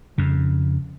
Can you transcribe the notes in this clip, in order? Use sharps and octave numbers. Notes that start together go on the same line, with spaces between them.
F2 C#3